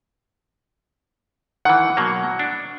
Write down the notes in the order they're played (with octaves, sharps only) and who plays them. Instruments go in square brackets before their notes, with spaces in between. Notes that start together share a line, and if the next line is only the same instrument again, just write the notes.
[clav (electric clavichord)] D#3 E3 [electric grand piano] F#5
[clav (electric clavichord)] B2 F#3 A#3
D4